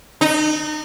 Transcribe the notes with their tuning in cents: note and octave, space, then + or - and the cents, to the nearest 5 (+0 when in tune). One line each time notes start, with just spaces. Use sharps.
D#4 -35